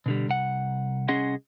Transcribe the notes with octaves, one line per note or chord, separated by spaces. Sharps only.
B2 D3 G3
C2 F#5
C2 C#4 G#4 D#5 F#5 C6